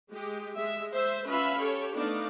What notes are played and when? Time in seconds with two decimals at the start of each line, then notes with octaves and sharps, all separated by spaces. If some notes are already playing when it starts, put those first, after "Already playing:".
0.11 G#3 G4
0.56 G#3 E5
0.92 C5 E5
1.25 C#4 F4 B4 E5 F5 B5
1.57 G4 A4 C#5
1.94 A3 B3 D4 D#4 D5 F5